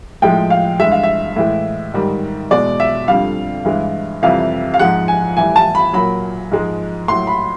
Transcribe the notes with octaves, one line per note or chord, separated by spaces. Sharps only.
A2 F3 G#3 G5
F5
G2 E3 G#3 E5
F5
E5
A2 E3 G#3
G#2 D#3 G3
E2 B2 G#3 D5
E5
F2 D3 G3 F5
G2 E3 G#3
F2 C3 E3 G3 F5
F5
G#2 F3 G#3 F#5
G#5
A2 E3 G3 G#5
A5
B5
A#2 F#3 B5
G#2 F3 G#3
A2 F#3 C6
B5